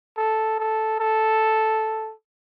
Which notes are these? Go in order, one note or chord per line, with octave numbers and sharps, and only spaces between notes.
A4
A4
A4